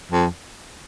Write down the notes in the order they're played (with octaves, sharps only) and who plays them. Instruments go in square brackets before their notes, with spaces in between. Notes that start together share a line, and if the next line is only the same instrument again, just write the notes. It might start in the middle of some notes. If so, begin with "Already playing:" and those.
[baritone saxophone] F2